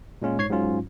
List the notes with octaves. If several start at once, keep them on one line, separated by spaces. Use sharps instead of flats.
A#2 G#3 C#4 F4
G#2 C#5 G#6 C7
G#2 F#3 C#4 F4